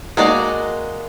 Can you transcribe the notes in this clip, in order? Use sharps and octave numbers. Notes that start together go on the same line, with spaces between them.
G#3 A#3 D#4 F#4 D5